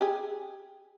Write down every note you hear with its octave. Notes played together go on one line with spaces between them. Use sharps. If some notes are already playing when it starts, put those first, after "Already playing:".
G4 G#4